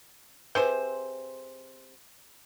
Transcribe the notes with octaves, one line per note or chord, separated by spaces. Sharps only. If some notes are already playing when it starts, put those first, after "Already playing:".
C3 G#4 B4 C5